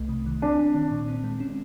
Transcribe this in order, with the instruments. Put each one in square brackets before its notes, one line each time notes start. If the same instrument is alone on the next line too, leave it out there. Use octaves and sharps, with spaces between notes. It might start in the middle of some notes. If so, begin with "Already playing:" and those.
Already playing: [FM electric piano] C2 A3
C3
D#3
[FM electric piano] C4 [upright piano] D4
[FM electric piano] C4
D#3
A#2
C4
G#3
C#4